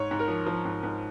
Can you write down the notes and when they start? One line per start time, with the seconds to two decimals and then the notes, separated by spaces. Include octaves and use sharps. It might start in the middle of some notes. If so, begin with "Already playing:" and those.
Already playing: G#2 C#5
0.11 G#2
0.19 A#4
0.28 F3
0.46 F3
0.65 G#2
0.83 G#2